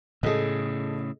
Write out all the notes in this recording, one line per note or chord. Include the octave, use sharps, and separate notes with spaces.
A2 C#3 G#4 A4 D#5